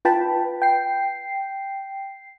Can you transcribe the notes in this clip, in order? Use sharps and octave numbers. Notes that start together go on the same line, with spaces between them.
F4 B4 G5 A5 B5
G5 C7